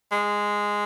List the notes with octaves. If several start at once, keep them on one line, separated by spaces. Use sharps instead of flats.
G#3